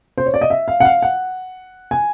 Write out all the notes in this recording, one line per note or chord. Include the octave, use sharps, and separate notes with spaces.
C5
C#5
D5
D#5
E5
F5
F#5
F5
F#5
G#5